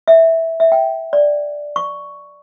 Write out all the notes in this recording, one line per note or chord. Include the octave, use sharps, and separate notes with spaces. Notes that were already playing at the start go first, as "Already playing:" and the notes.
E5
E5
G5
D5
C#6